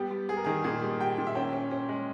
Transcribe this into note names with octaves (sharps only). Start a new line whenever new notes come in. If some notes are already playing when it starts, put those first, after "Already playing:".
Already playing: G3 B3 G4
G3
G3 G#4
A#4
D#3 G#4
A#2 G#4
G3
G3 G5
A#2
E5
C#4 G5
C#4
C#4
G#3